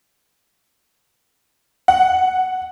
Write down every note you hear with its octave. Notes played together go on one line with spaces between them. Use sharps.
F#5